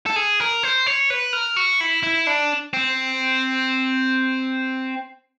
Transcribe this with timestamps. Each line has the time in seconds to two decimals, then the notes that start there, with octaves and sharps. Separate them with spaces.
0.06 A4
0.16 G#4
0.40 A#4
0.63 C5
0.86 C#5
1.10 B4
1.33 A#4
1.56 F#4
1.80 E4
2.03 E4
2.27 D4
2.73 C4